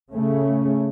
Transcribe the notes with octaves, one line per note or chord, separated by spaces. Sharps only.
C#3 A3 C#4